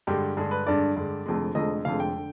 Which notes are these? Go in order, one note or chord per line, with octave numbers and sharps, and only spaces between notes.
G2 D3 G#3 G4
G2 D3 G#3 G#4
B4
G2 D3 G#3 D5
G2 D3 G#3
F1 F2 D3 G#3
F1 F2 D3 G#3 D#5
F1 F2 D3 G#3 F5
G5
D3